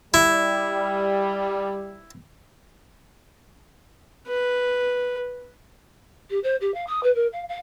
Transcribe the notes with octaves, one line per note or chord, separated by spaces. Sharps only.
G3 E4
B4
G4
C5
G4
F5
D#6
B4
A#4
F5
F5